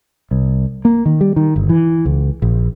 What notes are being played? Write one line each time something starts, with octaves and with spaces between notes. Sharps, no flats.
C2
A#3
D#3
G3
D#3
G1
E3
C#2
A#1